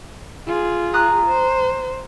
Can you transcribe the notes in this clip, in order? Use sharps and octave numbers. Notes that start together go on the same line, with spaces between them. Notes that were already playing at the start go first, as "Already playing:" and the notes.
F4 G#4
A#5 D#6 F#6
C5